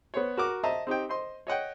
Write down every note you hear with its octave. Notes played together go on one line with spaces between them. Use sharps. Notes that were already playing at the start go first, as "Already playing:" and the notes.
B3 C5 C#5
F#4 A#4 D6
C5 D#5 E5 A5 A#5
C4 D#4 G4 G5
C5 D#5 C6
C#5 D#5 F#5 G5